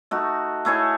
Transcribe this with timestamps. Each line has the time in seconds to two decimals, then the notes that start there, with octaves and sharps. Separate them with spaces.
0.11 A3 D#4 F#4
0.65 A3 E4 G#4 C#5